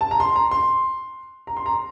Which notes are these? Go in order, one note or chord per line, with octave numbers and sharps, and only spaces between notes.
A5
A#5
C6
A#5
C6
A#5
C6
A#5